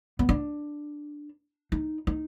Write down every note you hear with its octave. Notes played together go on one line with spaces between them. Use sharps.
B3
D4
D#4
D#4